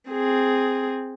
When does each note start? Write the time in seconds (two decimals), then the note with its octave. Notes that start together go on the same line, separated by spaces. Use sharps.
0.10 C4 G#4